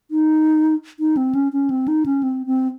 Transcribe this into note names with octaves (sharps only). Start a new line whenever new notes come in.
D#4
D#4
C4
C#4
C#4
C4
D#4
C#4
C4
C4